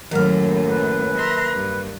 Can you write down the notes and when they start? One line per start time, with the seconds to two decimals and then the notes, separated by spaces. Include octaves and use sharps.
0.11 F#2 A2 D#3 F#3 A#3 A#4 F6
0.70 B4
1.17 E5 A#5 C6
1.52 G2